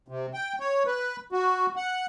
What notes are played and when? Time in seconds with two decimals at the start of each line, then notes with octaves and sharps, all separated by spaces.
0.08 C3
0.34 G5
0.60 C#5
0.86 B4
1.32 F#4
1.76 F#5